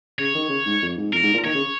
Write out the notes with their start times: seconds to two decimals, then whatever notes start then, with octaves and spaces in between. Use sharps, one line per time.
0.19 C#3 C#5
0.35 D#3
0.49 C#3
0.66 G#2
0.82 F2
0.97 G#2
1.13 F2 A#4
1.23 G#2
1.34 A#2
1.44 D#3 C#5
1.55 C#3